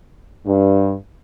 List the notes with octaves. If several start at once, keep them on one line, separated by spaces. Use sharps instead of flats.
G2